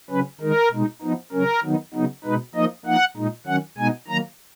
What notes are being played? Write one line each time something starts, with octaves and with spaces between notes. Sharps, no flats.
C#3 F#3 C#4 B4
D#3 G#3 D#4 A#4
B2 G#3 D#4
F3 B3 D#4
C#3 F#3 C#4 A#4
D#3 F#3 B3 D#4
C#3 F#3 B3 D#4
B2 G#3 D#4 B4
F3 A#3 D#4 D#5
F3 A#3 D#4 F#5
A#2 G#3 D#4
D#3 F#3 C#4 F#5
B2 G#3 B3 D#4 G#5
D#3 F#3 A#3 A#5